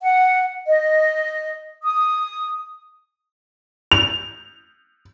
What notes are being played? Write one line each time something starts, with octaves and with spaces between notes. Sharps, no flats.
F#5
D#5
D#6
F7